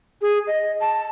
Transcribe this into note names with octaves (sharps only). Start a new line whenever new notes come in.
G#4
D#5
A5